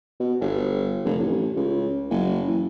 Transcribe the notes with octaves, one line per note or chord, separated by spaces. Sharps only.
B2
G1
F1
A1
C#2
F#1
E3